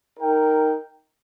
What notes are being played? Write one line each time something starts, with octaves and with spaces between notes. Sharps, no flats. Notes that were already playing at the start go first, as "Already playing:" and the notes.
D#4 A#4 G5